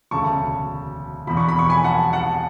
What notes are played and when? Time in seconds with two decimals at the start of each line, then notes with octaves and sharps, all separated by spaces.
0.11 E1 D2 C#3 A5 C#6
1.27 E1 E2 B2 B5
1.37 C#6
1.49 B5
1.59 C#6
1.70 G#5 B5
1.84 F#5 A5
2.13 F#5 A5